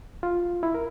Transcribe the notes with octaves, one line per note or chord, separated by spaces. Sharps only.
F4
E4
A#4